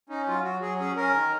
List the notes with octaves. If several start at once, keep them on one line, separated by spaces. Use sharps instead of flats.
C#4 D#4
F#3 F4
F#3 F#4
F#3 G#4
C#4 G#4
C#4 A#4
D#3